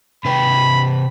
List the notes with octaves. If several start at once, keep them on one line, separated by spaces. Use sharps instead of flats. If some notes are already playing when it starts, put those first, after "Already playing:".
C3 B4 G5 B5